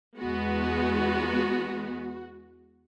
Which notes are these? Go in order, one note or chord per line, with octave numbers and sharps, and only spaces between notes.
E2 G#3 B3 F#4